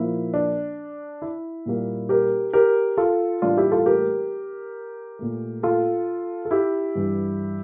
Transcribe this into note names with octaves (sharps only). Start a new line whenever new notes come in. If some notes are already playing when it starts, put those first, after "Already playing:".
Already playing: A#2 F3 A#3 E4
D4
E4
A#2 G3 A#3
G4 A#4
G4 A#4
F4 A4
A2 E3 G3 A#3 D4 F4
E4 G4
F4 A4
G4 A#4
A#2 A3
F4 A4
A4
E4 G4
G2 E3 G3